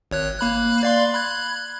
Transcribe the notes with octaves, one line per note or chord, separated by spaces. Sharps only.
G#1 C#5 F#6
A#3 B5 F#6
D5 F5 C6
B5 F#6 G#6